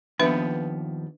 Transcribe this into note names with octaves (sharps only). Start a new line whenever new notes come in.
D#2 F3 B3 D4 B4 E5